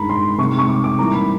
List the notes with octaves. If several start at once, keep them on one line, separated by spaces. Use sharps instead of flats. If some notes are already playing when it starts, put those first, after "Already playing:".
Already playing: G2 D#3 G#3 A#5 B5
C6
C3 D#3 G#3 C#6
C#6
D6
D6
G#2 E3 G3 A#3 A#5
B5